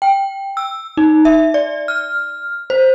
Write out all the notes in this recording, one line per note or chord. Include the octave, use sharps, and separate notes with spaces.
G5
E6
D#4
E5
D5
F6
C5